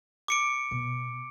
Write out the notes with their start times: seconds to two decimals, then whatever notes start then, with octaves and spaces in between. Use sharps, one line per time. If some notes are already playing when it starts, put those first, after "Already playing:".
0.28 D6 C#7 D7
0.71 B2